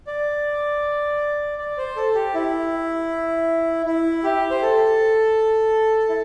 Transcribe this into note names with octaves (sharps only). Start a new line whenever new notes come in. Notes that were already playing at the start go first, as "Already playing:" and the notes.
D5
D5
C5
A4
G4
E4
E4
G4
C5
A4
E4